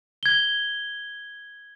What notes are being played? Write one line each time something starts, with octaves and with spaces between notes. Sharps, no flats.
G#6 G7